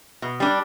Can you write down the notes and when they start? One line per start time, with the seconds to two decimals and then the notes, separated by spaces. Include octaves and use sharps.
0.22 B2
0.40 G3 D4